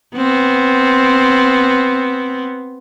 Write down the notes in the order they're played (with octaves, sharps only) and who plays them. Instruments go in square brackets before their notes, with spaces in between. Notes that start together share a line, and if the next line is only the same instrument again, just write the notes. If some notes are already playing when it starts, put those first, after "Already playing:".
[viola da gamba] B3 C4